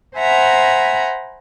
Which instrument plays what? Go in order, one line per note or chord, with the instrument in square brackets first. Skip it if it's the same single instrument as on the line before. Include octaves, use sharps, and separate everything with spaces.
[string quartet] C5 E5 F#5 G#5 A#5 B5